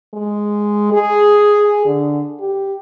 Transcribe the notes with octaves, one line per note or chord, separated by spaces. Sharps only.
G#3
G#4
D3
G4